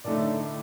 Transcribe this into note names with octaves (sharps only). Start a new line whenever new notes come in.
A2 D3 A3 D#4 A4 D5